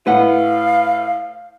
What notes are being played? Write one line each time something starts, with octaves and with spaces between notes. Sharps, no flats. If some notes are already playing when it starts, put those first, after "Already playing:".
A2 B4 F5 F#5